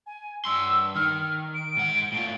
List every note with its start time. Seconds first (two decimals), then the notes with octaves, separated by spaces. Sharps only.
0.06 G#5
0.45 G2 C6 E6
0.96 D#3 F6
1.55 D7
1.77 G#2 F#5
2.12 A2 F4